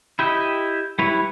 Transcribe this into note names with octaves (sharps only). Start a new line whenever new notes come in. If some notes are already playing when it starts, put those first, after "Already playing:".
E4 G4 D#5
G3 E4 B4 C#5